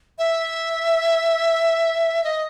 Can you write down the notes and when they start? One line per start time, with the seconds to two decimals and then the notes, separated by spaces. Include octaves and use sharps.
0.18 E5
2.24 D#5